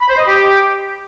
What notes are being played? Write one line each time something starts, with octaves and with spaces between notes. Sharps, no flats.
B5
C5
D#5
G4